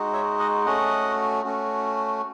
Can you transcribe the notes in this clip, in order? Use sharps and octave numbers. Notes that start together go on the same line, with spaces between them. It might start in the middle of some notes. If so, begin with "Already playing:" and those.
Already playing: G#3 D#4 F#4
C#5 E5
D#5 F#5
A3 C#4 F#4 D#5 F#5
A3 C#4 F#4